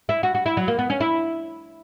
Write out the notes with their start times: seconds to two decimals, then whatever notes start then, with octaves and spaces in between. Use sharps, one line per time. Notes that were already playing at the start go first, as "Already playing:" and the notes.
0.09 E4
0.23 F#4
0.35 F#4
0.46 E4
0.57 F#3
0.68 A#3
0.79 B3
0.90 C#4
1.00 E4